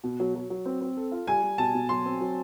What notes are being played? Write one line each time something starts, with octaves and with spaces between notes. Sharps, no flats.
B2
F#3
F#3
F#3
C4
C4
A4
F4
G3 G#5
G3
B2 A5
B2
F#3 C6
C4
F#3